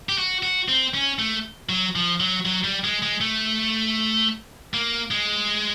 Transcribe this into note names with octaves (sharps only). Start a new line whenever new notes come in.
G4
F#4
F#4
C4
C#4
A3
F#3
F3
F#3
F#3
G3
G#3
G#3
A3
A#3
G#3